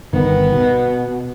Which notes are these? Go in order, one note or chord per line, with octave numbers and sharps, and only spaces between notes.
G1 D#3 B3
B2